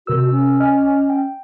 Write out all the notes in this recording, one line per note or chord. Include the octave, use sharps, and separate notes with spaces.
C3 F#4 A#4 E6
C#4
D#5 G#5 F6
G5